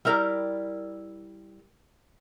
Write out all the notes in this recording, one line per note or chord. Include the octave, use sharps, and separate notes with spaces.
G3 E4 A#4 D5